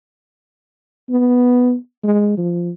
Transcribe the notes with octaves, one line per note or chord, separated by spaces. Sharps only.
B3
G#3
F3